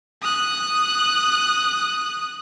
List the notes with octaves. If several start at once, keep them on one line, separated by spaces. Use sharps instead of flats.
D#6 F#6